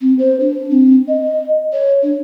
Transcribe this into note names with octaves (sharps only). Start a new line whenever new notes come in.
C4
C5
D4
C4
D#5
C#5
D4